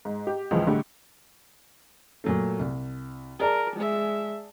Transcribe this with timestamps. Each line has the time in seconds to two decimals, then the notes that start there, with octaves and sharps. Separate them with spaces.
0.05 G#2
0.27 G4
0.51 C#2 G#2 E3 F3
0.67 A2 D3 G3 A3
2.24 A#2 F#3 A3
2.59 C2
3.40 G#4 A#4 D5 A5
3.76 G#3 E5